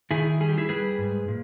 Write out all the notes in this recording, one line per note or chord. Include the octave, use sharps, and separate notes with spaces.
D#3 E4 G#4
G3 G#4
G4
E4 G#4
G3 G#4 B4
G#2
A#2